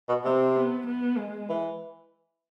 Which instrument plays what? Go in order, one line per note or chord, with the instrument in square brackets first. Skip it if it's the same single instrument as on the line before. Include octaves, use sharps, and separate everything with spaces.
[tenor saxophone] B2
[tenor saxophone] C3 [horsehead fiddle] C4
[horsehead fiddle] B3
B3
G#3
[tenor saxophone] E3